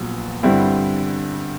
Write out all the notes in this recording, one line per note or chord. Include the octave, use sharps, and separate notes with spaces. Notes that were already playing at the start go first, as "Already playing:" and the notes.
Already playing: A#1 A#2 F#3 B3
G2 D3 G3 C4 E4